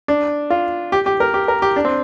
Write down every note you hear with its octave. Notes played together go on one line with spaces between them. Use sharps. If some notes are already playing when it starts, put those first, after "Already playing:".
D4
F4
G4
G4
A#4
G4
A#4
G4
D4
C4